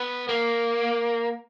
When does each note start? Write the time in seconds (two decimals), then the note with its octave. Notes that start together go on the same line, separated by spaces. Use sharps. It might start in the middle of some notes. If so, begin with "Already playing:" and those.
Already playing: B3
0.29 A#3